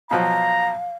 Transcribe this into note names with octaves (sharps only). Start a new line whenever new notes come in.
B2 F3 F#3 F5 A#5